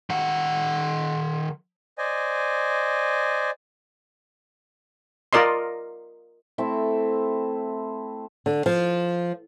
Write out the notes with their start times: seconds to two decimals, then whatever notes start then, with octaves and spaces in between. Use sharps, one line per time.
0.10 D#3 F#5
1.98 C5 D5 D#5 G#5
5.33 F4 A#4 D5 D#5 C6
6.58 A3 C4 E4 E5
8.46 D3
8.66 F3